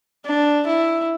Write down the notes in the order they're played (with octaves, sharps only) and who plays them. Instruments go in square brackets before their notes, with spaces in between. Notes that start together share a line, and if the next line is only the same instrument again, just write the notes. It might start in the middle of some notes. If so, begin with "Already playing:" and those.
[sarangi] D4
E4